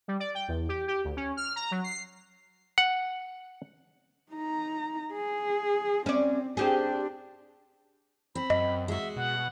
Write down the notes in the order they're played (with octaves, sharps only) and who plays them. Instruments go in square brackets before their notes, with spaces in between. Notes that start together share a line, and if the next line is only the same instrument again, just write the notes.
[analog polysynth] G3
D5
G5
E2
G4
G4
D2
C#4
F6
A#5
F#3
C7
[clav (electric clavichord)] F#5
[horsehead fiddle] D#4 A#5
G#4
[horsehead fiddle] C4 [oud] C#4 D5
[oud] C4 G4 G#4 [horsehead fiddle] D4
[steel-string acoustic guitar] C4 [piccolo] B5
[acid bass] F#2 [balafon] D#5
[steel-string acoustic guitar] G#3 F#4 [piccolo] E5
[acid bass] B2 [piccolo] F#5